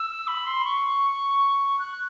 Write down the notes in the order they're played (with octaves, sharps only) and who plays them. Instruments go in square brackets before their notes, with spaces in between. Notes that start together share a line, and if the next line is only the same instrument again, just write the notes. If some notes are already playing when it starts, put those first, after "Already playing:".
Already playing: [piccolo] E6
B5
C6
C#6
F#6